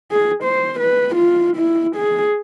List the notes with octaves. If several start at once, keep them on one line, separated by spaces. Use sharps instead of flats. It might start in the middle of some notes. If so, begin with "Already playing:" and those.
G#4
C5
B4
F4
E4
G#4